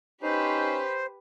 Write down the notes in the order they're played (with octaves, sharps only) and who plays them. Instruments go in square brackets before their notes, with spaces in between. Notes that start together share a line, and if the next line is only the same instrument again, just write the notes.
[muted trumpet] C#4 [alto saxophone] D#4 [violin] G4 B4 [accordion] C5